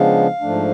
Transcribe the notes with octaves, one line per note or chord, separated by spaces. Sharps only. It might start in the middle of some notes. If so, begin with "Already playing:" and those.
Already playing: C#3 F3 G#3 B3 D4 F5
G#2 F3 A3 D4